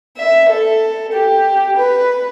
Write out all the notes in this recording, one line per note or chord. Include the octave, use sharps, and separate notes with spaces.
E5
A4
G4
B4